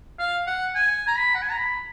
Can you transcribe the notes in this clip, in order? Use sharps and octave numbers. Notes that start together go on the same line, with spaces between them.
F5
F#5
G#5
A#5
B5
F#5
G#5
A#5
B5